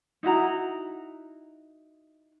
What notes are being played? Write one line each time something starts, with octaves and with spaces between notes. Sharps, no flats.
D#4 E4 F#4 A#5